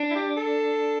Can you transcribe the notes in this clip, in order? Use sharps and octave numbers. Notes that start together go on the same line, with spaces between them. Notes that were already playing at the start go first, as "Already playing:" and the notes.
Already playing: D4
E4
G4
A4